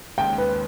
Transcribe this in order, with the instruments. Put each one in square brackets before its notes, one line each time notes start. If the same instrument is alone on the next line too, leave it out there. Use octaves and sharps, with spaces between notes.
[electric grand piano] D#2 C#3 G#3 [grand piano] G5
[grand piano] B4